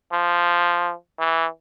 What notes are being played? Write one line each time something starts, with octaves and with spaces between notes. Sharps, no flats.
F3
E3